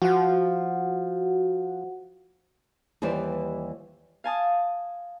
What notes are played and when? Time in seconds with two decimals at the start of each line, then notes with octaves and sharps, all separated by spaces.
0.02 F3 F#4 F#5
3.02 D#2 E3 G3 B4 C5 D5
4.24 F5 G#5 A5 D#6